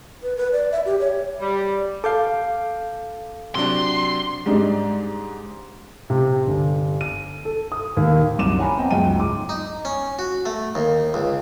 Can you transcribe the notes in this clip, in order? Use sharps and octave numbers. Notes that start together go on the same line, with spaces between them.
B4
B4
D5
E5
G4
C#5
G3
A4 F5 D6 G6 C7
C3 F#3 D4 C6
G#2 G3 D4 D#4
C3
G1
D#7
A4
D#6
D#2
C2 F#2 D6 D#7 E7
C#5 F#5 G#5 A#5 B5
B3 C4 D#5 G5
C#2 F#2 D#4 F4 G5 D#7
G#2 D6
D#4
C#4
F#4
A3
D#2
C#2